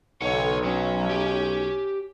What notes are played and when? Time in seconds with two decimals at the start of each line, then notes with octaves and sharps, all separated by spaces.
0.22 B1 A4 C#5 F#5
0.64 F#3 C#4
1.10 G4